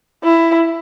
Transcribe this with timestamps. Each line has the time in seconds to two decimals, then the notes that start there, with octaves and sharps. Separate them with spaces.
0.24 E4